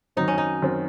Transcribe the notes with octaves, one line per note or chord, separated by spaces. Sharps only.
F#2 D#3 F#3 C4 D#4
C#4
D#4
F#2 D#3 F#3 C4